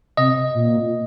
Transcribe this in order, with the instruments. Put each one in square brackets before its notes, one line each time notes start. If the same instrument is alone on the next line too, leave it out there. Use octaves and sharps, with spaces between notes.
[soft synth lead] C3 [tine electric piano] D#5
[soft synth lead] A#2